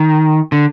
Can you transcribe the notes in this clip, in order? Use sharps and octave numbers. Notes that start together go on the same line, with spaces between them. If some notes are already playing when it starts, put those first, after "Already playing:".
Already playing: D#3
D3